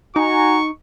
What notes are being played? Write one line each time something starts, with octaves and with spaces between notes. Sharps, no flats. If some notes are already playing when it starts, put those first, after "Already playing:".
D#4 F#4 G#5 A#5 C#6